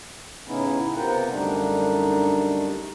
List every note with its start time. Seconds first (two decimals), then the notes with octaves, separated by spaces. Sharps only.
0.48 A2 C#3 B3 C#4 D#4 E4
0.96 C3 B3 F4 A#4 F#5 G5
1.29 F#2 D3 G3 A3 D4 D#4